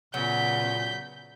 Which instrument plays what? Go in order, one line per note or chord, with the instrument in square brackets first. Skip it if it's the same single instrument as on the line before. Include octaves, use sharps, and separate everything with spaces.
[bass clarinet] A#2 [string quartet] C#3 B3 [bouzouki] F#3 [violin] G6 B6